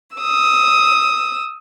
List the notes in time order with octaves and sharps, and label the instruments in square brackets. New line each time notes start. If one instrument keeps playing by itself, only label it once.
[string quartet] D#6 E6